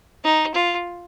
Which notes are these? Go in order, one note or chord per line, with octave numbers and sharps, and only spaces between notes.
D#4
F4